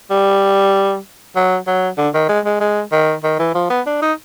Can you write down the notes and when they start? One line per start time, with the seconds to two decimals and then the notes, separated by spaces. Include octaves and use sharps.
0.10 G3
1.36 F#3
1.67 F#3
1.98 D3
2.14 D#3
2.29 G#3
2.45 G#3
2.60 G#3
2.92 D#3
3.24 D#3
3.39 E3
3.54 F3
3.70 B3
3.86 D4
4.02 D#4